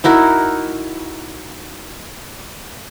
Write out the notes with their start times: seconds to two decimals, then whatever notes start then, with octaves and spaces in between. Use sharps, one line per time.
0.04 D#4 E4 F#4 A#4